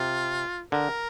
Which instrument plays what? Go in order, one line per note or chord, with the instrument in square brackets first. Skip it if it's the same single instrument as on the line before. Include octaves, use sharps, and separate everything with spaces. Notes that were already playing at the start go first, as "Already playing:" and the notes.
Already playing: [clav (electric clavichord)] C3 [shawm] F4
[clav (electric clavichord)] D3 [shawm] A#4